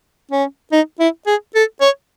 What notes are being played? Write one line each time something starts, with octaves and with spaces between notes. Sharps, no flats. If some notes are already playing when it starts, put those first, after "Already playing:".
C#4
D#4
E4
G#4
A4
C#5